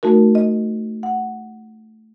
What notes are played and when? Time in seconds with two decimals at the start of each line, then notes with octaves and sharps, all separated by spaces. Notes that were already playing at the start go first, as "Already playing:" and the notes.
0.03 A3 D#4 F#4 A#4
0.35 D#5
1.03 F#5